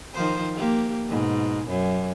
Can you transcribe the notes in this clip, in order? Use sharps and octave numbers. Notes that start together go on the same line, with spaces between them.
D#3 F3 C5
A#3 G4
G#2 B2
F#2